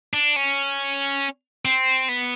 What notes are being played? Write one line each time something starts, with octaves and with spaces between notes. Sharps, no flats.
D4
C#4
C4
B3